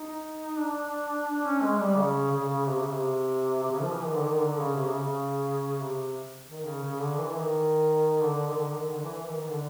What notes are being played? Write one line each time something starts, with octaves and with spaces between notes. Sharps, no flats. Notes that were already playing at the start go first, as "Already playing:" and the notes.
Already playing: D#4
D4
D4
C#4
G#3
G3
C#3
C#3
C#3
C3
C#3
C3
C3
C#3
F3
E3
D#3
D3
D#3
D3
C#3
C3
C#3
C#3
C3
D#3
C#3
C#3
D3
E3
D#3
D3
D#3
D3
D#3
D3
E3
E3
D#3
D#3
D3